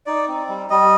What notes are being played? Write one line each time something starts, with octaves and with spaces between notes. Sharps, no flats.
D#4 D5
C4
G3
G3 D#5